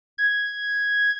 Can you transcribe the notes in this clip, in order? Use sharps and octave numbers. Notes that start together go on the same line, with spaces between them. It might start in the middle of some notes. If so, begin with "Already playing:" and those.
G#6